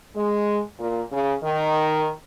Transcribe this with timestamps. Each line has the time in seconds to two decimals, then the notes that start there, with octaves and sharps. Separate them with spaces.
0.16 G#3
0.79 A#2
1.12 C#3
1.43 D#3